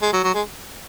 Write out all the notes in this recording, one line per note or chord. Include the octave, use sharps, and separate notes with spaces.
G#3
F#3
F#3
G#3